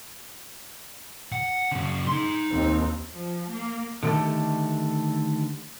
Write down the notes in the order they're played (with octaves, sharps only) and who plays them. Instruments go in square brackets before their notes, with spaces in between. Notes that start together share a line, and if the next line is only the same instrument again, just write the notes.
[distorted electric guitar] F#5
F#2 C#3
D#4 C6
[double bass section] D#2 C4
[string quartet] F3
A#3
[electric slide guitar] D3 D#3 F#3 A3 G4 A4